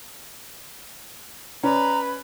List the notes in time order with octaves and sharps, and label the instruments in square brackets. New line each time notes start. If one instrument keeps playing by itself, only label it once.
[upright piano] C#4 D5 [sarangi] B4 [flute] A#5